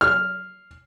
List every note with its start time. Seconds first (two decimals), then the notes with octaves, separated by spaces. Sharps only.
0.01 F6